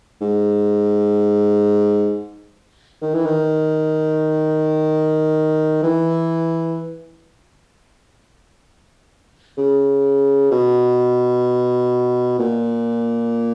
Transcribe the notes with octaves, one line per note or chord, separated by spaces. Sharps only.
G#2
D#3
E3
D#3
E3
C#3
B2
A#2